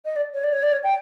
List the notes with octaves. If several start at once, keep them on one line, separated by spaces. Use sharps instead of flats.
D#5
D5
C#5
D5
C#5
D5
C#5
G5